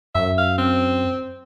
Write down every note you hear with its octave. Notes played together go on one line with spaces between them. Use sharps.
F#2 E5
F5
C4